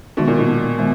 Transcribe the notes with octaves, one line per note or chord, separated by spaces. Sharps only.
B2 D#3 G#3 D#4 F#4
A#2
B2
D#3 G#3 B3